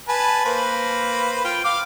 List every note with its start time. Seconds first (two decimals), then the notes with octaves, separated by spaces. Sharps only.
0.08 B4 G#5 A5
0.45 A#3 B4 C5
1.45 F4 G5
1.64 F5 D6